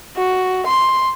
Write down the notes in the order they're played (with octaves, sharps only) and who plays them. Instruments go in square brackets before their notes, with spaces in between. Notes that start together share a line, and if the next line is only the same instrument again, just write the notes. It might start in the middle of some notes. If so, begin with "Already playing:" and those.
[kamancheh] F#4
C6